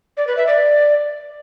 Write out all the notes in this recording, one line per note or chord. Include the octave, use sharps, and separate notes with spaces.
D5
B4
E5
D5